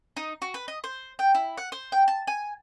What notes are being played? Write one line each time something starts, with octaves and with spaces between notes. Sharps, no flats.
D#4
F#4
B4
D#5
C5
G5
E4
F#5
C5
G5
A5
G#5